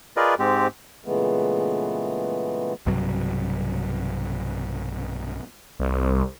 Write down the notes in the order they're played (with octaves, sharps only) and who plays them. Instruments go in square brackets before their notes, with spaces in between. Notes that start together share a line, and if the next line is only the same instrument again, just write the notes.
[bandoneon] F4 G#4 A#4 B4 D5 D#5
G#2 G#3 C4 G4
[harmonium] A#2 C#3 E3 G#3 A3 B3
[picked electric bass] B1 G2 C3 F#3
[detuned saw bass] C2